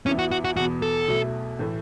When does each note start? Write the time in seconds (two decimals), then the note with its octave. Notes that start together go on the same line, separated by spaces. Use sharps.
0.06 E2 E3 B3 C#4 E4
0.19 F#4
0.31 F#4
0.45 F#4
0.56 E2 B2 B3 F#4
0.82 A4
1.08 B1 B2 A3 E4
1.59 A2 E3 A3